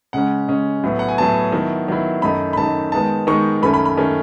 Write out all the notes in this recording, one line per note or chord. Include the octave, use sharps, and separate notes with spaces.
C#3 G#3 C#4 F#5
C#3 G#3 C#4
A2 F#3 B3
F#5
G#5
A2 F#3 B3 A5
D#3 F#3 B3 E4
D#3 F#3 B3 E4
F#2 D#3 A3 D#4 B5
B5
F#2 D#3 A3 D#4 A5
D#3 G#3 B3 D#4 A5
D#3 G#3 B3 D#4 C#6
F#2 D#3 A3 C#4 B5
B5
B5
D#3 A3 C#4